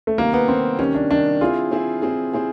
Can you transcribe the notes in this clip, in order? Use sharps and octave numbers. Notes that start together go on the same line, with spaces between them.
A3
C3 D#3 G3 A#3
B3
C3 D#3 G3 C4
C3 D#3 G3 C#4
D4
C3 D#3 G3 D4
C4 E4 F4 G#4
C4 E4 G#4
C4 E4 G#4
C4 E4 G#4